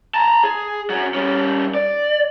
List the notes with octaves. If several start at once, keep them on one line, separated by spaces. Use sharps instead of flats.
A5 A#5
G#4
F#2 F#3
G3 C#4
D5